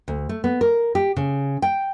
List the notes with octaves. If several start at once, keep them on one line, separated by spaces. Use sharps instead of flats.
D2
A3
B3
A#4
G4
C#3
G5